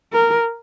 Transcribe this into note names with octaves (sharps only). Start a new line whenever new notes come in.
A#4